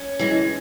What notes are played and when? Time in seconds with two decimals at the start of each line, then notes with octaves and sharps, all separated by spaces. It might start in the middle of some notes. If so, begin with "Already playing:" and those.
Already playing: C#4
0.19 E3 G#3